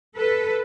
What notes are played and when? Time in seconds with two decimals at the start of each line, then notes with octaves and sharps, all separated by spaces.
0.17 A4 B4